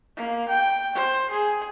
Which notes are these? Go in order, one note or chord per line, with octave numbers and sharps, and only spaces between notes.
A#3
G5
C5
G#4